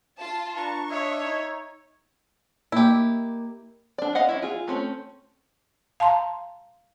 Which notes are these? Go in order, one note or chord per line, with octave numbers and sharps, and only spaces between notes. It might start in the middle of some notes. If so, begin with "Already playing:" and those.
F4 A5
D4 B4 A5 A#5 C#6
C#5 D#5 E5
D#4
A#3 E4 G4 D#5
D4 D5
D5 D#5 F5 F#5
C#4 E4
F4 G#4
A3 C4 C#4
F5 A5 A#5 C6